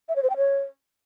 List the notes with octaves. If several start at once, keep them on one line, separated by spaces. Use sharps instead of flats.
E5
C#5
C5
G5
C#5